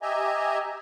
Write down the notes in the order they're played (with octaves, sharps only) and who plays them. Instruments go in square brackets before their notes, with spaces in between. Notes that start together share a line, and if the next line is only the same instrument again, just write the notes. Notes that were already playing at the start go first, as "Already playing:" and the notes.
[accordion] G4 D#5 E5 G#5 A#5